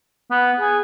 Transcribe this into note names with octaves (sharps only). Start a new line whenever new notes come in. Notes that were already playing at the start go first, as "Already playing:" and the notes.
B3
G#4